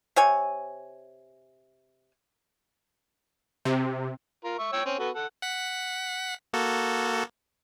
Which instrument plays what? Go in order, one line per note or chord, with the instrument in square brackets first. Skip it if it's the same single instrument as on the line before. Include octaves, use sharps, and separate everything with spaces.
[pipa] C3 C#5 G#5
[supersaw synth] C3
[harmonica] F4 A#4
E5 C#6
C#5 G5 E6
C4 C#4
B3 F#4 A4
A4 F#5
[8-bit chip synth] F#5 B6
A#3 F#4 A4